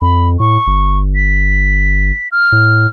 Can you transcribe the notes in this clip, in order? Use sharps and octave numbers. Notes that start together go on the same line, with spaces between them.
F2 B5
A2 C#6
G1
B6
F6
A2